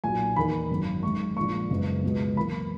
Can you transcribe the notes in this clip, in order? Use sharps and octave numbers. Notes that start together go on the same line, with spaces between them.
B1 A#2 F#3 G#5
E2 D#3 A#3 B5
G#1 F#2 D#3
F#2 D#3 G#3 C#6
A#1 A#2 G#3 C#6
F#1 F#2 C#3 G#3 B3
C#2 B2 G#3 B3
F#2 E3 A#3 B5